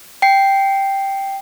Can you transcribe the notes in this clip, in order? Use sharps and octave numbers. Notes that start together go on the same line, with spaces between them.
G5 C7